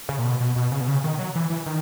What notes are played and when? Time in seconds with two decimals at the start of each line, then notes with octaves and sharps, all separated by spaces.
0.09 C#3
0.18 A#2
0.24 B2
0.40 B2
0.56 B2
0.72 C#3
0.81 B2
0.88 C#3
1.04 D#3
1.19 F#3
1.35 E3
1.50 E3
1.66 D#3